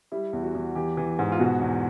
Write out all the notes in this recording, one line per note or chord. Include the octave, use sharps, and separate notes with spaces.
G3 E4
E2
F#4
E2
E3 G4
E3
G#2
F4
B2 F#4
E2